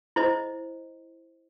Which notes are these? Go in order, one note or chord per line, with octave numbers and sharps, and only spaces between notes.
E4 C5 D#5